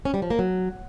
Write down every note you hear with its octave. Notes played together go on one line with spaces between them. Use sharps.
C#4
G3
F3
A#3
F#3